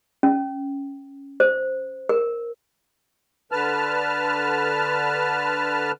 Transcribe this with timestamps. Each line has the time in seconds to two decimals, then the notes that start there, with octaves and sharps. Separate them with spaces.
0.23 C#4
1.40 C5
2.09 A#4
3.52 D3 B4 A5 F6